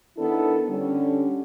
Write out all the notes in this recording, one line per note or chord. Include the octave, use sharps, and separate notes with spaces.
D#3 B3 D4 E4 A4
D3 G3 C#4